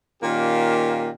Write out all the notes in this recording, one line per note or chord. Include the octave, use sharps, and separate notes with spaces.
A#2 D#3 A#3 C#4 G4